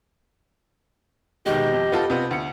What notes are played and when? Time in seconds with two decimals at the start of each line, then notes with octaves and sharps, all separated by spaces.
1.46 B2 D#3 G#3 G4 D#5
1.73 F2
1.92 B3 F4 A4
2.10 C3 B3 F4
2.31 D2 C#7